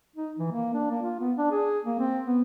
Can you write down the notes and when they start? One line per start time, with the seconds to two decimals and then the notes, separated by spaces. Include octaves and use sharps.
0.16 D#4
0.39 E3
0.52 A#3
0.74 D4
0.91 A#3
1.02 F4
1.20 B3
1.36 D4
1.51 G#4
1.85 A#3
2.00 C4
2.26 B3